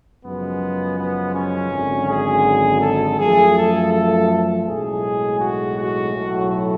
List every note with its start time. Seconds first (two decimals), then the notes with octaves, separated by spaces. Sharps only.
0.24 F#2 C#3 F3 G#3 B3
0.98 B3
1.35 C#4
1.71 G#1 F#2 D3
2.08 G#4
2.81 A4
3.18 F#2 F3 A3 G#4
3.55 A4
3.92 A4
4.66 B1 A2 G#3 G#4
5.40 F#4
5.77 F#4
6.13 B1 A2 F#3 A3